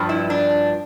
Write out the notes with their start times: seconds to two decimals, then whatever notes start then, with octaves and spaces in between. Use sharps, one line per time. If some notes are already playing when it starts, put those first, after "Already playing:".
Already playing: G2 F3
0.09 E4
0.30 D4